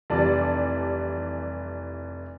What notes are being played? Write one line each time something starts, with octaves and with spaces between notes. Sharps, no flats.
F1 E3 G3 D5 A5